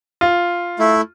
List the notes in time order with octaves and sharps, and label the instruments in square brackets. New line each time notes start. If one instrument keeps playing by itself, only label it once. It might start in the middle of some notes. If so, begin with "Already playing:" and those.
[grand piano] F4
[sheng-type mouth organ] A3 E4